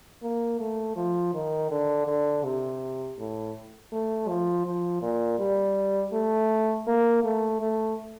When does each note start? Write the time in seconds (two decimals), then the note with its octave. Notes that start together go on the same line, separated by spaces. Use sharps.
0.23 A#3
0.60 A3
0.96 F3
1.34 D#3
1.71 D3
2.07 D3
2.44 C3
3.18 A2
3.92 A3
4.29 F3
4.66 F3
5.02 A#2
5.39 G3
6.13 A3
6.87 A#3
7.24 A3
7.61 A3